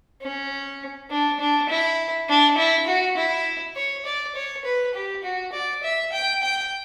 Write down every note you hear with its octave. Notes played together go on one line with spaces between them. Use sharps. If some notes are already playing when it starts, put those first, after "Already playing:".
C#4
D4
D4
E4
D4
E4
F#4
E4
C#5
D5
C#5
B4
G4
F#4
D5
E5
G5
G5